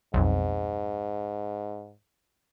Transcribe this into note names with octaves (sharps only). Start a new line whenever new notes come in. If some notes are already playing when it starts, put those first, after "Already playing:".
B1 F2 G#2